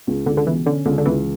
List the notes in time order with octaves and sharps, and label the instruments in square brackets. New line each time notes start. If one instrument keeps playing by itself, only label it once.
[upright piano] C#2
[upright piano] C#2 [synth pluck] D3
[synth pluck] D3
[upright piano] B2 [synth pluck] E3
[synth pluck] D3 [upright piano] C#4
[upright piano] C#2 [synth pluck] D3
[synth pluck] D3
[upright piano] C#2 [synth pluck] E3